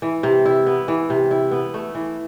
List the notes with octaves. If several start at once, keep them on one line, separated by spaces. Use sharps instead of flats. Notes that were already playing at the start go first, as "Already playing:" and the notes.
E3
C3
E4
B3
E3
C3
E4
B3
A3
E3